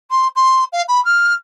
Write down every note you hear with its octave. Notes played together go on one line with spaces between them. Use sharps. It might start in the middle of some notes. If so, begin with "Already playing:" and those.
C6
C6
F5
B5
F6